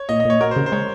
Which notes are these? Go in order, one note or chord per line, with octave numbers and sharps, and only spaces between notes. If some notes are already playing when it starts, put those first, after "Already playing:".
Already playing: C#5
A#2 D#5
D#5
A#2 C#5
F#4 A#4
C5
C#3
C5
G#3 C#5